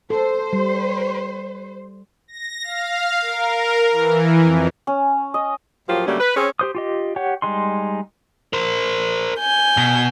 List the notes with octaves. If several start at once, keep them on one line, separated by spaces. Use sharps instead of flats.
A4 C5
G3
A#6
F5
A#4
E3
F2
C#4
D#5
A2 F3 F#3 A#3 F4 G4
D3 F#3 G3 A3 A#3 C#4
B4
C4 C#4 G#4
G4 C5 D#6
F4 G4 D#5
G4 C#5 F#5
G3 G#3 D#4 C6
A#4 C5
G#5 G6
B2